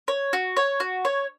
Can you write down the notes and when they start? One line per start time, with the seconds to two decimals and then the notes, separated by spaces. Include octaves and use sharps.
0.08 C#5
0.33 F#4
0.57 C#5
0.80 F#4
1.05 C#5